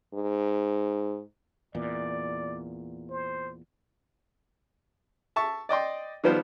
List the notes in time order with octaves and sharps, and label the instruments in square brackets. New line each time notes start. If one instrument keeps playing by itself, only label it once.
[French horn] G#2
[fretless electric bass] E2 A#2 [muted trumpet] D5
[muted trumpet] C5
[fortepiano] E5 A5 C#6
D5 D#5 G5 C6
D#3 F3 G3 B3 F4 C5